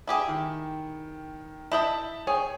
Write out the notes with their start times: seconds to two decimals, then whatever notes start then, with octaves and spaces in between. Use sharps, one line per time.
0.07 E4 G4 G#4
0.28 D#3
1.72 E4 D#5 E5 A5 G6 F#7
2.27 G#4 C#5 G5